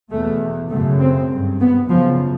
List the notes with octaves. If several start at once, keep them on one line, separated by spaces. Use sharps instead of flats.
E2 B2 A3
F#2 C#3 A3
C4
G2
B3
F#2 C#3 F3